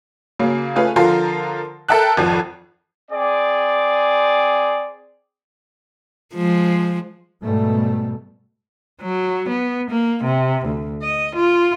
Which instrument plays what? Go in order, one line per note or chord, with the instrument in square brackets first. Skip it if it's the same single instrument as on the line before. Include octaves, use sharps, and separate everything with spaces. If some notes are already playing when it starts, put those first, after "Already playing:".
[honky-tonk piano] C#3 F#3 A#3
A3 C#4 F4 G#4 B4
D3 F3 F4 A#4 C6
A4 A#4 E5 G5 A5 F#6
G#1 F2 F3
[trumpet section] C4 G#4 D5
[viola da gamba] F3 G#3
[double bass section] G#2 B2 G3 A3
[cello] F#3
B3
A#3
C3
D2
D#5
F4